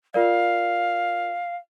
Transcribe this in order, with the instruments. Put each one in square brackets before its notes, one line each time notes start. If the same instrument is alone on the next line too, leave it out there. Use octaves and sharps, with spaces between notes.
[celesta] F4 A#4 D5 [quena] F5